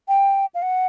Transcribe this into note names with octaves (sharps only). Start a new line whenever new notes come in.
G5
F5
F#5